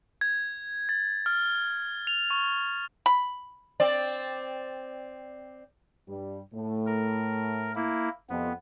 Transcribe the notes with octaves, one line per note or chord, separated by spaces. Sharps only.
G#6
A6
F6
F7
C#6
B5
C4 D5
G2 G3
A2 A3
A#4
A#3 E4
F2 C3 B3 C4